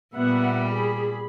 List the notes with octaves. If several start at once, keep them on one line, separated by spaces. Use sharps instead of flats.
A#2 G3 B3 E5 F#5
G#4 B5